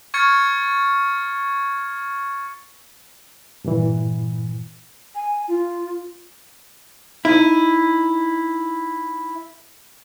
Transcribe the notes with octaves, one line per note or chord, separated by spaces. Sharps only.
C#6 F6 G#6 A6 C#7
G2 A#2 E3
G#5
F4
D#4 E4